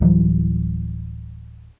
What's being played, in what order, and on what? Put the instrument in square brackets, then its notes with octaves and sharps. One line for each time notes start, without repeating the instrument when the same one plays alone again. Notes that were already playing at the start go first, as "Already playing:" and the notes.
[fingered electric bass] D1 E3 F#3 G3